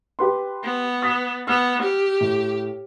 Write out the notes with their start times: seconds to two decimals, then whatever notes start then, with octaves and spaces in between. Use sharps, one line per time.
0.19 G4 B4 C6
0.64 B3
1.02 D#6 A6 B6
1.47 B3 E6 F6
1.82 G4
2.21 A2